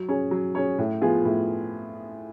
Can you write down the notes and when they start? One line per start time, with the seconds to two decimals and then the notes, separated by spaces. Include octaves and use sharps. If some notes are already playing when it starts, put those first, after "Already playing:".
Already playing: F#3
0.09 C#4 G#4 C#5
0.31 F#3
0.55 C#4 G#4 C#5
0.78 A2
1.01 F3 B3 F4 G#4
1.25 A2